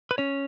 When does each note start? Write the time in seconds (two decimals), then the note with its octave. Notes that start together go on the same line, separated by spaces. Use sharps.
0.11 B4
0.18 C#4 C#5